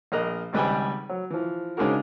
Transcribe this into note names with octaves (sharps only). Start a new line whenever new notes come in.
A#1 A#4 D#5 A#5 F#6
G#1 C#2 G3 B4 G5 G#5
F#3
E3 F3
C#3 G#3 D4 D#4 F#4 A#4